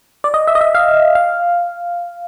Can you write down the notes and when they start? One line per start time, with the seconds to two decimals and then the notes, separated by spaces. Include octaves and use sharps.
0.24 D5
0.34 D#5
0.47 E5
0.55 D#5
0.61 E5
0.75 F5
1.15 F5